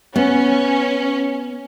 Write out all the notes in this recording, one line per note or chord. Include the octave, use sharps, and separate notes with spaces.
B3 C#4